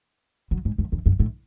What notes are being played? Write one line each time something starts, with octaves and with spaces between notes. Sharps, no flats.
F#3
G#2
F#2
E2
F#2
A2